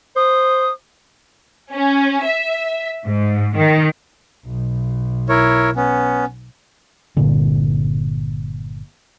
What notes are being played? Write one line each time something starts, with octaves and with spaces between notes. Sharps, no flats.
C5 D#6
C#4
E5
G#2
D#3
B1
E4 A#4 C#5
B3 C#4
G1 A#2 D3